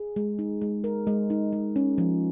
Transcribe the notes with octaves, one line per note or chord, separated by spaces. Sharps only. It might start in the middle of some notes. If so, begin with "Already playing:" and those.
Already playing: G#4
G#3
D#4
G#3
A#4
G#3
D#4
G#3
C#4
F3